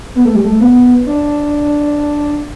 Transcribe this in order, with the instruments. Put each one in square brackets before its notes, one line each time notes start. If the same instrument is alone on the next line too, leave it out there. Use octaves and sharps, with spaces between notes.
[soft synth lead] B3
A3
G3
A3
B3
D4